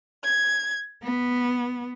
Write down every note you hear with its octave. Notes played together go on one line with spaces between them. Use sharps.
G#6
B3